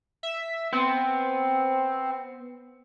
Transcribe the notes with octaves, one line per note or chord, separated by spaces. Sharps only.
E5
B3 C4